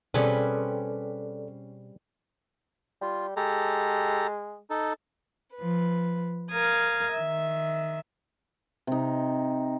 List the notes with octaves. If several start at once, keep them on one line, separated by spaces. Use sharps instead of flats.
B2 G3 C4 C#4 G#4 A4 B4 D5
G3 F4
G#3 G4 A4 A#5
D#4 A4
F3 B4
A#4 F5 D#6 G#6
D#3 E5
C3 D#4